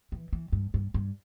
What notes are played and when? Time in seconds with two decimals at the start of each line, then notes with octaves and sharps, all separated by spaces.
0.12 E3
0.33 E3
0.52 G2
0.74 G2
0.94 G2